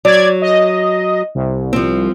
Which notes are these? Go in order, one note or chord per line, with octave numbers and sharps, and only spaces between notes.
F#3 D5 G#6
D#5
C2
F3 C4